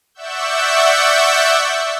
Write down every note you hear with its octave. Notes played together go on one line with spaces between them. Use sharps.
D5 E5 F#5 C#6 E6 G6